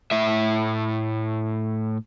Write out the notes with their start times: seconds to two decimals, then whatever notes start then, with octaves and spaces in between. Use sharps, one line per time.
0.11 A2 E5